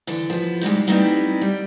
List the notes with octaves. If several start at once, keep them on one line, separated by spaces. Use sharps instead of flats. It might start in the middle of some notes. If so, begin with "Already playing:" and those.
D3 E3
F3 B3
G#2 C3 G3 G#3
G3 A3 B3 C4 D#4 E4
G3